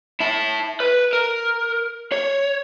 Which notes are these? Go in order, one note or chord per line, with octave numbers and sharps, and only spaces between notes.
E4 A5
B4
A#4
C#5